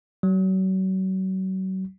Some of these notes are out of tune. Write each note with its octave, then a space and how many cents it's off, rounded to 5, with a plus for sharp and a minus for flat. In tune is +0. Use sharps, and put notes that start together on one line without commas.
F#3 +35